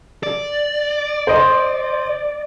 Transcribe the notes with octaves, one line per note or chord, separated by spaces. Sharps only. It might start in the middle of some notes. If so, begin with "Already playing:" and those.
D5
C5 D#5 C6